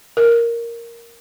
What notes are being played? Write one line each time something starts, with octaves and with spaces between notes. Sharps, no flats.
A#4